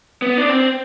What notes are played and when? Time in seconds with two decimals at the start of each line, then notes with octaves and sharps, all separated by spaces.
0.22 B3
0.38 D4
0.49 C4